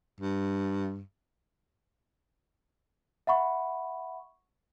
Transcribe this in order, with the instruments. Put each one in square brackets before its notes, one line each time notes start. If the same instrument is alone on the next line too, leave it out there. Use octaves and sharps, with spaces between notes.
[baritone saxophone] G2
[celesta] E5 F#5 B5 C#6